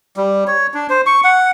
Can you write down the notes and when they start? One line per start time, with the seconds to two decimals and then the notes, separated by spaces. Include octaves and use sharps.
0.17 G3
0.48 C#5
0.74 D4
0.90 C5
1.06 C#6
1.24 F#5